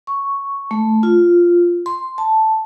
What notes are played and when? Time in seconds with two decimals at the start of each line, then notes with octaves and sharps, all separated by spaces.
0.07 C#6
0.71 A3
1.03 F4
1.86 C6
2.18 A5